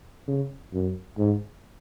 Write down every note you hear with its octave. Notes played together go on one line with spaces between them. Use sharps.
C#3
F#2
G#2